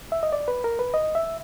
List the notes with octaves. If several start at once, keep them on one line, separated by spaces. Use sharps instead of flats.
E5
D#5
D5
B4
A#4
B4
D#5
E5